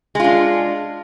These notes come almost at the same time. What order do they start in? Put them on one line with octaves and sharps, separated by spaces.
G#3 F4 D4